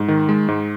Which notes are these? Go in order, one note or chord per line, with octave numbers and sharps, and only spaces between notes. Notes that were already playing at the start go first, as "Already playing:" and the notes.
Already playing: G#2
D#3
G#3
G#2